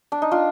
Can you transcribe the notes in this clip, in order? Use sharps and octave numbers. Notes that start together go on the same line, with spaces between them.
D4
D#4
D4 F4